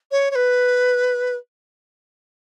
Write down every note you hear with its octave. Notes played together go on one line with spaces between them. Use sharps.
C#5
C#5
B4